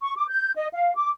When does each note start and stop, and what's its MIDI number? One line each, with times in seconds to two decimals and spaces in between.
0.01 0.16 85
0.17 0.25 86
0.30 0.51 91
0.55 0.67 75
0.73 0.94 77
0.95 1.09 86